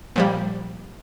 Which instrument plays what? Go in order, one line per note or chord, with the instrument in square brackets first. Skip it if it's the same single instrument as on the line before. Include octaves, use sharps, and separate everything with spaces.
[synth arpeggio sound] A#2 F3 G3